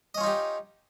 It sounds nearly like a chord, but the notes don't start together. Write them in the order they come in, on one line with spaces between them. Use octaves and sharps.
D#5 C#4 F4 D#4 G4